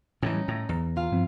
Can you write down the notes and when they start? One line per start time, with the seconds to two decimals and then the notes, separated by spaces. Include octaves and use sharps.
0.23 A2 D#3 E3 C#4 D#4
0.34 G3
0.48 A2 A#6
0.69 E2 A#5
0.96 E3 F4 F5
1.12 G2 F3 C4